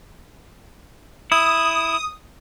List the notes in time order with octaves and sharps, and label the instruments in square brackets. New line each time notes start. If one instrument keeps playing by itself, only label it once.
[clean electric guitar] E4 [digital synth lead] D#6